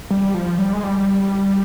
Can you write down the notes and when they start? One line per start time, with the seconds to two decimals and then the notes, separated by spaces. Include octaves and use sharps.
0.11 G3
0.34 F3
0.59 G3
0.73 G#3
0.83 G3